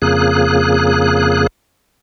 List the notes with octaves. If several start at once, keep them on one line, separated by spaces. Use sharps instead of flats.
F2 C#3 A#3 G#4 F#6